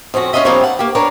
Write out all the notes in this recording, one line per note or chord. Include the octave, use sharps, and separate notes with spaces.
F2 C4 C#4 F#4
C#4 D4 F4 F#4 D#5 E5
D3 F3 G3 A#3 C4 C#5
F#5
A#3 G4
D4 A#4 B4 C#5 D5